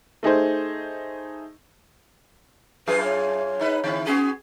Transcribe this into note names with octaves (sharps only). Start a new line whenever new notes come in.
A3 D#4 G#4 C5
F#2 F4 G#4 B4
C#5
G#2 D#4 B4
D3 C4 E4
B3 C#4 F#4 G#4